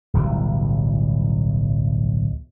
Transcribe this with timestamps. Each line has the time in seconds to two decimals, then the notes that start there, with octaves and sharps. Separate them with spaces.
0.14 D1 B1 E3 G3